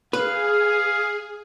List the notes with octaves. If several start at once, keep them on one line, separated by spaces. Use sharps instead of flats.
G#4 B4 F5